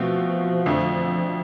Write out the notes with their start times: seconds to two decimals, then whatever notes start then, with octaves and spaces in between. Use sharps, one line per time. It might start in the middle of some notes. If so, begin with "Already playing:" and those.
Already playing: B2 F3 A3 C4
0.66 F2 D3 A3